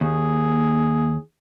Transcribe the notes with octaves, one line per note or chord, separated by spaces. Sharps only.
D#2 A#3 G#4